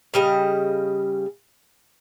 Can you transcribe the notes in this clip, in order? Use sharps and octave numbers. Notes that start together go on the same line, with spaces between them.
C#3 G3 D#5